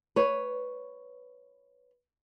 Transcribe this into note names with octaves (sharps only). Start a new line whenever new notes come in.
B4 C#5